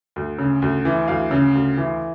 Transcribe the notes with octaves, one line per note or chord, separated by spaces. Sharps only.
D2
C#3
D2
E3
D2 F5
C#3
D2
E3